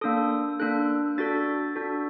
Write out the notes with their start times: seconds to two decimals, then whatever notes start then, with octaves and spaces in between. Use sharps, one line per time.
0.01 A#3 D4 A4 D#6
0.60 A#3 D4 A4 F#6
1.18 D4 F#4 A4 A6
1.76 D4 F#4 A4